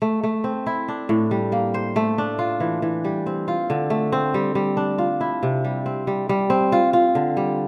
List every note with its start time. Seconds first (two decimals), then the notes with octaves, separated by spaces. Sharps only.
0.02 A3
0.23 A3
0.44 C4
0.67 E4
0.88 D4
1.09 A2
1.31 G3
1.52 A#3
1.74 C5
1.96 A3
2.18 D4
2.39 F4
2.60 E3
2.82 E3
3.05 G3
3.26 C4
3.48 F4
3.70 D3
3.90 A3
4.12 C4
4.34 G3
4.55 G3
4.77 D4
4.98 F4
5.21 E4
5.43 C3
5.64 G3
5.86 C4
6.07 G3
6.29 G3
6.50 C4
6.72 F4
6.93 F4
7.15 D3
7.37 G3